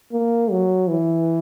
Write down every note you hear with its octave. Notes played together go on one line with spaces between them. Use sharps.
A#3
F#3
E3